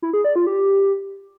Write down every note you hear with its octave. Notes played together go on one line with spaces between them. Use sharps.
E4
G#4
D5
F4
G4